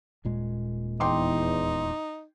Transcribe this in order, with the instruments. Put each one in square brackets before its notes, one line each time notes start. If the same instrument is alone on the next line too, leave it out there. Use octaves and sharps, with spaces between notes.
[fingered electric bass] D#1 A#2 G#3
[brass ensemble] E2 [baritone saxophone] D#4 [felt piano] G5 C6 D6